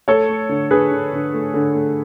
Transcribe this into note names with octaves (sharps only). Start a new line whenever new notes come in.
A3 A4 C#5
A3
D3
D3 G#4 B4
D3
D3
A3
D3
A3